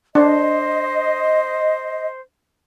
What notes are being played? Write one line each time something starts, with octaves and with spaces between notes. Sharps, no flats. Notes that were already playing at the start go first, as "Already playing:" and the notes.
D4 C5 D#5